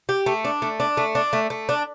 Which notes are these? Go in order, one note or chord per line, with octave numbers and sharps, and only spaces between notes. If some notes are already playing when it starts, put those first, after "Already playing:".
G4
A3
D4
A3
D4
A3
D4
A3
A3
D4